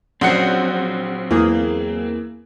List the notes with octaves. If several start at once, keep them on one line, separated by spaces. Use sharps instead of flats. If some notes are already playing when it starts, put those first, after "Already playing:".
A#1 F#3 C4 C#4 F#5 C#7
E2 E3 A#3 G#4